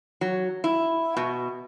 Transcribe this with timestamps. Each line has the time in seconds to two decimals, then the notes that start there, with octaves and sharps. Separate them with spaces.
0.21 F#3
0.64 E4
1.17 B2